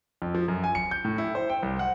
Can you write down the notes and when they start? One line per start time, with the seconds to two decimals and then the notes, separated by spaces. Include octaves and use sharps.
0.22 F2
0.35 F3
0.48 F#2
0.64 G#5
0.75 C#7
0.91 G6
1.05 A2
1.18 E4
1.35 C5
1.50 G5
1.63 C2
1.79 F#5